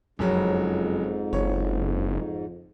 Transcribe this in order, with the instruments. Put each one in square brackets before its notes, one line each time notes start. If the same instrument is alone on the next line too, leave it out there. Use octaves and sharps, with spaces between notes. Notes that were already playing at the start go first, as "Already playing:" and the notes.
[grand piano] F#1 C#3 F#3 [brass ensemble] F2 [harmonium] G#2
[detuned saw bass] F#1 [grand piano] C#5